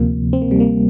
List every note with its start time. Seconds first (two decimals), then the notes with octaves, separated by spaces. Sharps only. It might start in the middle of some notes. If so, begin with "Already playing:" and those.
Already playing: D2 C3 F3 A#3
0.33 C4
0.42 A#3
0.51 G3
0.60 A#3